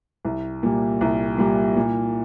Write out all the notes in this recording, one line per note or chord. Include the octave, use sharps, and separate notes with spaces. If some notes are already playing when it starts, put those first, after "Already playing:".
C2
A#2 G3
C2
A#2 G3
A#2